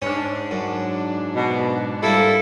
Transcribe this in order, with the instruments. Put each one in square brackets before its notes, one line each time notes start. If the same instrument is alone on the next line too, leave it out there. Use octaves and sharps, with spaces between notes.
[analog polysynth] G#2 D4 [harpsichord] C#4
[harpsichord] F#2
[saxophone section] B2
[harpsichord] G3 A#3 [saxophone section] E4 A4